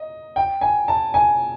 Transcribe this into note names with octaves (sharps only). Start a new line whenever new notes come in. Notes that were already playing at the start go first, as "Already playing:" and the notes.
Already playing: D#5
G5
G#5
A5
G#5